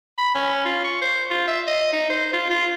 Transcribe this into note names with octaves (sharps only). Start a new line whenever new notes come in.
B5
C#4
F4
C#6
C5
F4
E5
D#5
D#4
C5
F4
F4